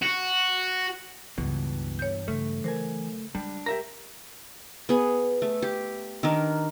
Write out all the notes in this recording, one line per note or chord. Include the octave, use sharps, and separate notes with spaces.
F#4
C#2 G2 B2 E3
C#5 G6
C#3 F#3 A3
E3 A#4 C5 G#5
G3 G#3 D4
G4 A#4 E5 A#5
B3 G#4
A3
G4
D#3 D4 A#4